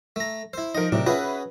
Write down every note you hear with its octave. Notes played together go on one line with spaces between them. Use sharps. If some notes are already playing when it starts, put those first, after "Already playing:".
A3 A#5
E4 C5 E6
F3 D#4 A#4 D#5
A2 C3 F#3 A3 D4
C#4 F4 F#4 G#4 B4 E5